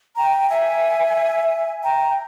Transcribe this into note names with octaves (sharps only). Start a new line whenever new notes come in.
G5 A#5
E5 G#5
G5 A#5